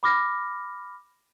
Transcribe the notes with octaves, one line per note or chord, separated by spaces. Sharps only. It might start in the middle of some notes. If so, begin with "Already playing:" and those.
B5 D6 F6 A#6